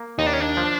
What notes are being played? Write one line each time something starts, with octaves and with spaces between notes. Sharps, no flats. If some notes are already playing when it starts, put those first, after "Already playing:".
Already playing: A#3
D#2 D#4
D4
C#4
D4
F3